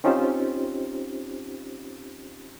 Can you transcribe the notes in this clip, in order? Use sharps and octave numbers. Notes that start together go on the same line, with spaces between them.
C4 C#4 D#4 F4 G4 C5